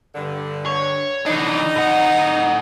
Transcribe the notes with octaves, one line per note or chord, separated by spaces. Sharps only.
G2 D3
C#5
E3 D4 D#4
A2 F#5